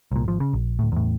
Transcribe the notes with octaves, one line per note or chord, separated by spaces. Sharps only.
C2 A#2
G#1 F3
C#3
A#1
D1 A2
E2 A2